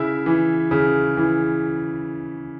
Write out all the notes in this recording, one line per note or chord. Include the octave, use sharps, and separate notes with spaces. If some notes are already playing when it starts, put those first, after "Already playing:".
Already playing: C#3 E4 E5
E3
C#3
E3